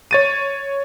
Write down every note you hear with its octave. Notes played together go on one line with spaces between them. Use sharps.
C#5 A6 D#7